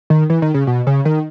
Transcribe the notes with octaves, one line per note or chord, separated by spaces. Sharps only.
D#3
E3
D#3
C#3
B2
C#3
D#3